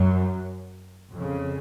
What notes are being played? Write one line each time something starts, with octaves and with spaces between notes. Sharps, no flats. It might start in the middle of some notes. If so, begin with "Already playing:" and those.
Already playing: F#2 F#3
F2 C#3